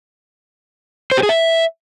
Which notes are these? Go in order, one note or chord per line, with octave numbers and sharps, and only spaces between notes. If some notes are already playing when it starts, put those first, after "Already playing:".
C5
G4
G#4
E5